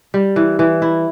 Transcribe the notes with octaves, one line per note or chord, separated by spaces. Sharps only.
G3
E3
E3
E4